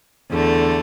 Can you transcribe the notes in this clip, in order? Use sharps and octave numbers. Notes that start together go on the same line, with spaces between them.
E2 D3 A3